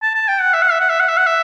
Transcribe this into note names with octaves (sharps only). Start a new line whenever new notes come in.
A5
A5
G5
F#5
E5
F#5
E5
F#5
E5
F#5
E5
F#5
E5